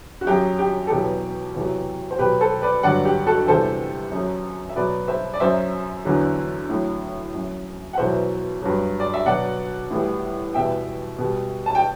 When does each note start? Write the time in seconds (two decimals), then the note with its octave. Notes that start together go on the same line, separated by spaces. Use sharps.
0.21 F#4
0.27 F#2 F#3 G4
0.59 G4
0.87 A4
0.90 E2 B2 F#3 G4
1.55 E2 C3 F#3
2.11 C5
2.19 B2 F#3 G4 B4
2.40 A4 C5
2.62 B4 D5
2.83 G2 D3 F#3 D5 F#5
3.05 G4
3.27 F#4 A4
3.47 E2 C3 G3 A4 C5
4.12 F#2
4.17 F#3
4.69 E5
4.76 B2 F#3 B4 D5
5.08 C5 E5
5.34 D5
5.40 F#2 F#3 C5 E5
6.05 E2 D3 F#3
6.69 A2 F#3
7.34 F#2 F#3
7.93 F#5
7.98 E2 B2 F#3 C5 E5
8.62 G2 F#3
9.00 D5
9.14 E5
9.26 B2 F#3 D5 F#5
9.91 A2 E3 G3
10.54 E2 B2 G3 E5 G5
11.18 B2 G3
11.66 A5
11.75 G5